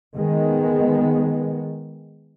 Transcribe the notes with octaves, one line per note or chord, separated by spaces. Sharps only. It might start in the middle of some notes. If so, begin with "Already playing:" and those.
D#3 G#3 B3